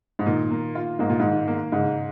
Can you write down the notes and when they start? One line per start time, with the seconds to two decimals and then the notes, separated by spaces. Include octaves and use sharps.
0.19 G#2
0.26 A#2 D#3
0.51 A#3
0.75 F4
0.99 G#2 A#3
1.10 A#2
1.19 G#2 D#3
1.48 A#3
1.72 G#2 C#3